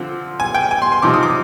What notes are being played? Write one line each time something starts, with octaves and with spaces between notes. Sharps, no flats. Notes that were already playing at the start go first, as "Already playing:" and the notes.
Already playing: D3 F3 C4
G#5
G5
G#5
C6
C6
C3 F3 C4 D#4 D6
D#6
D6